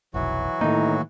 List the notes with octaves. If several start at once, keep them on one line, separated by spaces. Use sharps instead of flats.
F1 B1 E3 F#3 F#4
A2 D#3 A#3 D#4